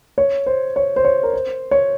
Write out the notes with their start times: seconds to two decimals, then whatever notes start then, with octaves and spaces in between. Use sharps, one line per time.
0.18 C#5
0.46 C5
0.76 C#5
0.96 C5
1.05 C#5
1.23 A#4
1.33 C5
1.71 C#5